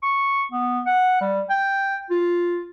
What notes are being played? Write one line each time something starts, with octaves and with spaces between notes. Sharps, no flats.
C#6
B3
F#5
G3
G5
F4